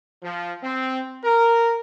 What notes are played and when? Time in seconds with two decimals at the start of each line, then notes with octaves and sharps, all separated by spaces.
0.23 F3
0.62 C4
1.24 A#4